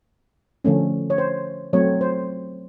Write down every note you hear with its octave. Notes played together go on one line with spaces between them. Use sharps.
D3 F3 A3 C#4
C#5
C5
F#3 A3 C4 C#5
C5